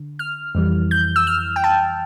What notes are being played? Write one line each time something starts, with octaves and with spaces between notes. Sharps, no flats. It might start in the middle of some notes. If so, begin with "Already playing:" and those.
Already playing: D3
F6
F2 E3 G3
G6
E6
F6
G5
A5